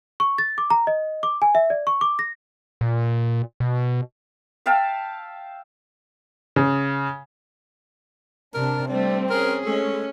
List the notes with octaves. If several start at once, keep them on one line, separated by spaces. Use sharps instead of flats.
C#6
A6
D6
A#5
D#5
D6
G#5
E5
D5
C#6
D6
A#6
A#2
B2
E5 F5 G5 A5
C#3
C3 D4 A#4
G3 A3 C4 D4
C#4 G#4 A#4
G#3 A3 C#4